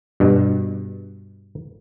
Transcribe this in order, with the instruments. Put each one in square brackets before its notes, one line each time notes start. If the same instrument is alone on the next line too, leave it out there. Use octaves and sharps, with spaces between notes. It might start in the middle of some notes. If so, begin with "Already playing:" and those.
[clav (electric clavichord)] G2 B2